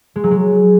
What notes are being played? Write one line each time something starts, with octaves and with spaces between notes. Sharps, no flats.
G#3
F#3
G#3